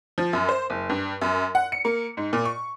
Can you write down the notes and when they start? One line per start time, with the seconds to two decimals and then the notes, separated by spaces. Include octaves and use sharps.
0.18 F3
0.33 F#2
0.49 C5
0.70 F#1
0.89 G2
1.22 F#2
1.55 F#5
1.72 C#7
1.85 A#3
2.17 G#2
2.33 A#2
2.45 C#6